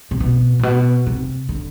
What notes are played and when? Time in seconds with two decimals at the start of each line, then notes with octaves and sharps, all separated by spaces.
0.11 C3
0.20 B2
0.59 A2
0.63 B2
1.07 C3
1.49 D3